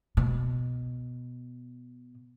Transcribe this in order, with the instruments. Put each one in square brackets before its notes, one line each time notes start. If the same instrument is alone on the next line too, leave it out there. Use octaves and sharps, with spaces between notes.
[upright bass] B2